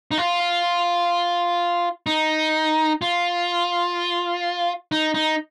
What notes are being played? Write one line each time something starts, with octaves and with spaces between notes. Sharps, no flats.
D#4
F4
D#4
F4
D#4
D#4